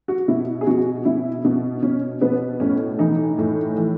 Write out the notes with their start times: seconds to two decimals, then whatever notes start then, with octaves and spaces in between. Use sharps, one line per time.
0.08 F#4
0.28 B2 E4
0.61 G#4
0.66 B2 F#4
1.05 B2 E4
1.45 B2
1.82 B2 C#4
2.21 B2 B3
2.60 A2 C#4
2.99 E3 D#4
3.38 A2
3.77 E3